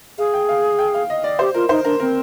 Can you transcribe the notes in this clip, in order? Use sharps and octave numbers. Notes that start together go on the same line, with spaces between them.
G#4 F5
G5
F5
G5
F5
D#5
D5
G4 C5
F4 A#4
D#4 C5
D4 A#4
C4 A#4